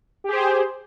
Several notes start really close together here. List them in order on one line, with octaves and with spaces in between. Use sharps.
G4 G#4 C5